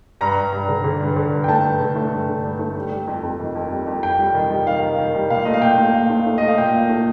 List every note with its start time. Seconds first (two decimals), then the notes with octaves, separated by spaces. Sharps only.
0.21 G2 A#5
0.36 G2
0.52 G2
0.68 D3
0.84 D3
1.00 G2
1.16 D3
1.33 G2
1.44 G5
1.48 A3 A5
1.64 G2
1.81 D3
1.96 A3
2.12 G2
2.28 D3
2.44 G2
2.59 A3
2.76 G3
2.92 G3
3.07 F2
3.23 F2
3.40 D#3
3.55 F2
3.71 G3
3.87 F2
4.03 F2 G5
4.19 G3
4.34 D#3
4.50 G3
4.67 D#3 F5
4.82 D#3
4.98 D#3
5.15 G3
5.30 A#2 F5
5.45 A3 D#5
5.54 F5
5.62 A#2 G5
5.78 A3
5.94 A#2 F5
6.10 A3
6.26 A3
6.38 A3 D#5
6.48 F5
6.57 A#2 G5
6.74 A#2
6.89 A3